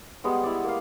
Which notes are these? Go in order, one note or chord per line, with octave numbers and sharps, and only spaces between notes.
G3 G#3 B3 F#5
E4 D5
A#3 F5